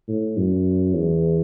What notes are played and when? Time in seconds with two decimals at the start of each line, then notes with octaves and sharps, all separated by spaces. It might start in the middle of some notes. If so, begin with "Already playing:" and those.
0.08 A2
0.38 F#2
0.95 E2